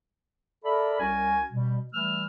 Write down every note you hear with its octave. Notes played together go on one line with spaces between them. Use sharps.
A4 A#4 D5 E5 B5
C2 C#4 F#4 A#4 G#5
B2 G3
E3 G3 A3 E6 F6